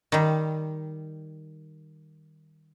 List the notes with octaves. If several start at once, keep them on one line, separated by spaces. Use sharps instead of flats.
D#3 G3